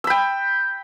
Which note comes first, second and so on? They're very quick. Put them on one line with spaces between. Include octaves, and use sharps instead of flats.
E6 B5 G5